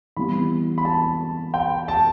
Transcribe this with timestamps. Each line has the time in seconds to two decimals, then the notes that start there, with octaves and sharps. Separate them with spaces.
0.17 E3 G3 B3 B5
0.78 B5
0.85 A5
1.54 G5
1.88 A5